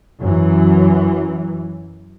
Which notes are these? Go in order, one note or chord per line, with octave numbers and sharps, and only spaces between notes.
F#2 E3